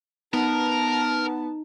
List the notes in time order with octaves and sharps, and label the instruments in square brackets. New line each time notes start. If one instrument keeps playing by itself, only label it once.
[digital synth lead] B3 [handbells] D#4 [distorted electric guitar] A#4 [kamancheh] A5